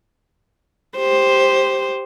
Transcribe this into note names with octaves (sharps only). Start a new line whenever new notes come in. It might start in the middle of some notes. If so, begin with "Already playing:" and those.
G4 C5